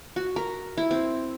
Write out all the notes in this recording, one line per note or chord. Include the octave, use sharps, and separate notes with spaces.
F#4
A#4
E4
C4